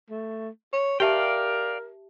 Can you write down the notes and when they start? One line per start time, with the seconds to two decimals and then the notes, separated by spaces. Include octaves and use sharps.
0.10 A3
0.73 C#5
1.00 G4 A#4 D5 E5 F5 G5 A5